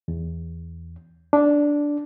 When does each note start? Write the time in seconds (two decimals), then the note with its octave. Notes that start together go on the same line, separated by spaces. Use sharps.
0.08 E2
1.33 D4